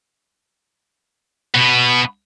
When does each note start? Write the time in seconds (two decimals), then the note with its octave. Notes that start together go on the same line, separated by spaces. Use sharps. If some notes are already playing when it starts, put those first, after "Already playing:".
1.54 B2 B3